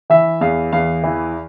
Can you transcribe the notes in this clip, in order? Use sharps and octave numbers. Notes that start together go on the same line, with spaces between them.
E3 E5
E2 F5
E2 F5
E3